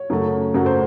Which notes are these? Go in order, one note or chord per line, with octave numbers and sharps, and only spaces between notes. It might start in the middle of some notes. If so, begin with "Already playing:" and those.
Already playing: C#5
F#2 C#3 F#3 A3
F#2 C#3 F#3 A3
C5